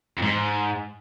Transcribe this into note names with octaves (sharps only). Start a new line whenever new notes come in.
F2 G#2